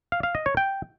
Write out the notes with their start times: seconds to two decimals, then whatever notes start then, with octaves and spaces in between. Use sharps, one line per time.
0.12 F5
0.23 F5
0.35 D#5
0.46 C#5
0.57 G5